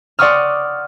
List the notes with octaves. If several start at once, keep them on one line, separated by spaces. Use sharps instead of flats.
D5 F#5 C6 C#6 D#6 F6